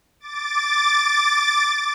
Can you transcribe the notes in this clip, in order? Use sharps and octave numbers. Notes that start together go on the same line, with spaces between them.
D6 A6